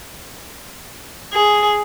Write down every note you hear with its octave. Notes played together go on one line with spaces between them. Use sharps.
G#4